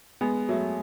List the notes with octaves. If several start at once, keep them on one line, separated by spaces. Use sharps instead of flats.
G#3 B3
F#3 A3